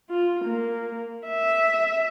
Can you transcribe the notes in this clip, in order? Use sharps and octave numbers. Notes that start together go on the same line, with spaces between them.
F4
A#3
E5